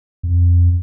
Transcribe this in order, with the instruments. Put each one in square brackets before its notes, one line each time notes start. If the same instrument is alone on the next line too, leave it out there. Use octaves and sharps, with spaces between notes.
[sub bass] F2